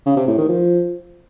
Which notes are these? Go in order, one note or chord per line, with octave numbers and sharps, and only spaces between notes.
C#3
C3
A2
D#3
F3